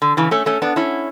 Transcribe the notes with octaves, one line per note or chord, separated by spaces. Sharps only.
D3
C#3 E3
A3 C#4
A3 C#4
B3 D4
C#4 E4